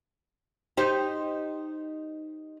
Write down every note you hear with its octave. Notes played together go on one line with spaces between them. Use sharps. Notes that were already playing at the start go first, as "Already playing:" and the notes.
D#4 G4 C5